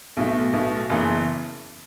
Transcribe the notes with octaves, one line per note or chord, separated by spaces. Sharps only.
B1 B2 A3
B1 B2 A3
F#1 F#2 C#3 E3 B3